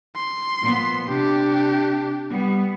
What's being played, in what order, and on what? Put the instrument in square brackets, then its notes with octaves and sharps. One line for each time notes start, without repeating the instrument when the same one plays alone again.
[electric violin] C6
[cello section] A#2 F3 B3
[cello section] C3 [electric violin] D4 G4
[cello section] G3 B3